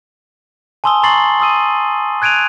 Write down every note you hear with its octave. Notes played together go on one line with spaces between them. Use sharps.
G#5 A5 C6 D#6 E6 G7
A#5 C6 C#6 A6 C7 F#7
C6 D#6 E6 D#7
F#6 G#6 D7 D#7 F7